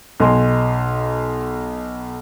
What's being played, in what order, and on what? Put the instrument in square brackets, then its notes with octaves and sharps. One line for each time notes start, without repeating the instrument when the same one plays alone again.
[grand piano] B1 D#5 G#5 C6